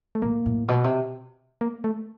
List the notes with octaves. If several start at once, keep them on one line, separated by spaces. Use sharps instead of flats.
A3
A2 A#3
A2
B2
C3
A#3
A3